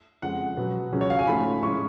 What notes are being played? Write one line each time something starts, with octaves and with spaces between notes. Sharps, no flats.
F2 C#3 G#3 F#5
B2 F#3 B3
C#2 C#3 F#3 C#4
C#5
F5
G#5
G#2 F3 A3 C#4 B5
A2 G#3 C#4 C#6